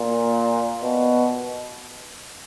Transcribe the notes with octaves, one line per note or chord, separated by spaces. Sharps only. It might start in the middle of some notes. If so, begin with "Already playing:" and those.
Already playing: A#2
B2